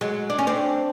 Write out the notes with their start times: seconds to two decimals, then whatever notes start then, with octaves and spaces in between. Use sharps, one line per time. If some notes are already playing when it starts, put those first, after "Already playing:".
0.01 F#3 G#3
0.30 D4
0.39 C#4
0.47 C4 D4